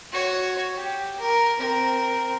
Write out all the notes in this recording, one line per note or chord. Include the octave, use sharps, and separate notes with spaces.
F#4 C#5
G4
A#4
C4 A#4